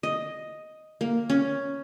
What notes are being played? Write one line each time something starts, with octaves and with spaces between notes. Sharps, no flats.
D#5
A#3
C#4